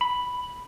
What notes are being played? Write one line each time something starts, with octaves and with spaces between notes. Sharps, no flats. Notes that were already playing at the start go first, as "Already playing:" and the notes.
B5